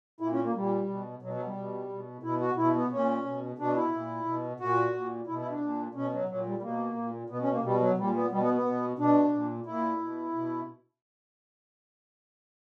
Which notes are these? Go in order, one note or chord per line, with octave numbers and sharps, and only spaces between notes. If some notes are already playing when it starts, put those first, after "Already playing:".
A#2 E4
C#4
A#3
A#2 G3
B2
B2 F#3
F#3
G3
B2
B2
B2 E4
F#4
B2 E4
B3
A#2 C#4
B2
B2 D4
E4
A#2
B2
A#2 F#4
A#2
B2 E4
E4
D4
A#2
B2 C#4
F#3
A#2 F#3
G3
G3
B2 A#3
A#2
B2 B3
C#4
A#3
B2 G3
F#3
A#2 G3
B3
B2 G3
B3
B3
B2
B2 D4
A#2
A#2 E4
B2
B2